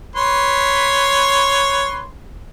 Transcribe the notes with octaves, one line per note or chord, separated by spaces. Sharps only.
B4 C#5 C6